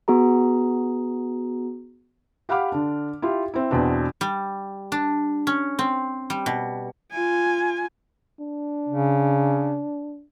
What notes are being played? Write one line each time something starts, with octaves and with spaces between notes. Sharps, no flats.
B3 F#4 G#4 A#5
G4 F5 F#5 B5 D6 F6
D3 D4
E4 F4 G4
C4 E4
E2 B2 C4 D4
G3
D4
C#4
C4
G3
B2
F4 G#5
D4
C#3